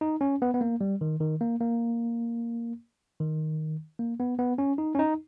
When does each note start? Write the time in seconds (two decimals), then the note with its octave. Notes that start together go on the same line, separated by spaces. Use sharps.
0.01 D#4
0.21 C#4
0.42 B3
0.54 B3
0.61 A#3
0.81 G3
1.01 D#3
1.21 D#3
1.41 A#3
1.61 A#3
3.20 D#3
3.99 A#3
4.20 B3
4.39 B3
4.58 C#4
4.78 D#4
4.95 C#4
4.99 D#4